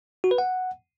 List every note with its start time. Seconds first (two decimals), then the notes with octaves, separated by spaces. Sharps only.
0.24 F#4
0.31 B4
0.38 F#5